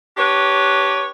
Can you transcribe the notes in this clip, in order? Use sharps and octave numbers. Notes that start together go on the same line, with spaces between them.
D4 G4 B4 C#5